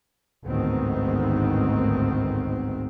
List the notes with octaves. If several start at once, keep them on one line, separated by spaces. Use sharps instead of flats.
A1 D2 G#2 D#3 B3 C4